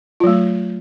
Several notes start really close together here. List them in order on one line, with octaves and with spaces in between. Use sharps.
F4 F#3 A3